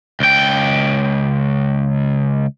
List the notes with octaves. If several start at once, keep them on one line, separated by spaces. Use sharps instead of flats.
C#2 G5